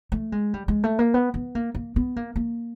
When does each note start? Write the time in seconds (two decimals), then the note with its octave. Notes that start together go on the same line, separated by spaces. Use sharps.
0.12 A3
0.32 G#3
0.54 G3
0.68 G#3
0.84 A3
0.99 A#3
1.14 B3
1.34 B3
1.55 A#3
1.75 A#3
1.96 B3
2.16 A#3
2.36 A#3